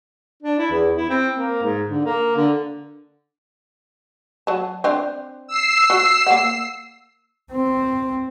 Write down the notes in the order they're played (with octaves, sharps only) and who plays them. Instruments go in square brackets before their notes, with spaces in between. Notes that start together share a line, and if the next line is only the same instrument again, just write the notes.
[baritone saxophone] D4
E4
E2
E4
C4
A#3
G#2
D3
A#3
D3
[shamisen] F#3 A5
C4 D4
[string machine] E6 C7
[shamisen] F#4
A#3 F#5
[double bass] C4